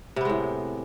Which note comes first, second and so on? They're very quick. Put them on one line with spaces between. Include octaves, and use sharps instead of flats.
C3 B3 G#3 A2